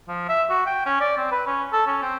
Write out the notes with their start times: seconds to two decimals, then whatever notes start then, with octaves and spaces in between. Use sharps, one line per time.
0.08 F3
0.29 E5
0.50 F#4
0.66 G5
0.86 C#4
1.00 D5
1.17 C4
1.32 B4
1.47 C#4
1.73 A4
1.87 C#4
2.02 C4